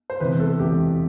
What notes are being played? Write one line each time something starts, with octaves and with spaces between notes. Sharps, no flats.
C5
E1 E2 C3 B4
A4
E1 E2 C3 G4